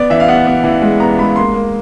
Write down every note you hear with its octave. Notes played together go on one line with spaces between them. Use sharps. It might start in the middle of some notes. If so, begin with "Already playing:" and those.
Already playing: B3 D5
E3 E5
F5
B3 F#5
B3
E3
G#3
B3 A#5
G#3 B5
A#3 C6
A#3